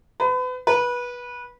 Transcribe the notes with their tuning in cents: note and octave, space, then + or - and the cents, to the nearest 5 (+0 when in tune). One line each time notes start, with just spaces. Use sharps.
B4 +35
B4 -20